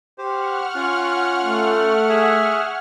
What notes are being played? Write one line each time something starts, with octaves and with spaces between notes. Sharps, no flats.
G4 C5 F#5 C#6 F6
C#4 F4
A3
G#4 E5